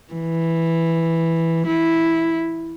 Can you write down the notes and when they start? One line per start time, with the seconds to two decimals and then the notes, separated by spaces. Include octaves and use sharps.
0.13 E3
1.67 E4